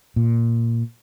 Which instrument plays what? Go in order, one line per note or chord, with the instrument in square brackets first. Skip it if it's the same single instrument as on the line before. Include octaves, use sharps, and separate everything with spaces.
[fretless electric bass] A#2